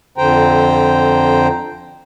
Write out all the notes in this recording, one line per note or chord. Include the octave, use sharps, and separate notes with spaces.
F2 D3 C5 G5 A#5